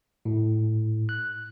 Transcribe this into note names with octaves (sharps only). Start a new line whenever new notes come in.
A2
F#6